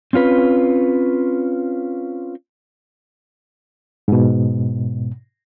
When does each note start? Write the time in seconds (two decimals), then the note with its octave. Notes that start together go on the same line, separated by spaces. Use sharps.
0.13 C4 C#4 F4 B4
4.08 G#2 B2